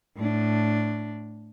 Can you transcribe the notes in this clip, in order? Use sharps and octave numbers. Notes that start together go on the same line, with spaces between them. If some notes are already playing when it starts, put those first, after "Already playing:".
A2 D4